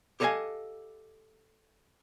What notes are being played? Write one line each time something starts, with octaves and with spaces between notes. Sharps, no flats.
G4 A4 C#5 D#5 F5 G#5